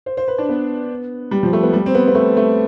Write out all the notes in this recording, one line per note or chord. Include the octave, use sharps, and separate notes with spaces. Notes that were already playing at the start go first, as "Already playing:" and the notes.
C5
C5
B4
D4
B3
G3
F3
A3
B3
G3
C4
B3
B3
A3
A3